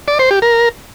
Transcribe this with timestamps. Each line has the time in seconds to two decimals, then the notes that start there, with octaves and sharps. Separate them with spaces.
0.08 D5
0.19 C5
0.31 G4
0.42 A#4